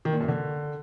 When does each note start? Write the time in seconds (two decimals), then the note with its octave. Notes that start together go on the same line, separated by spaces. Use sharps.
0.05 D#3
0.13 A#2
0.21 F#2
0.28 D3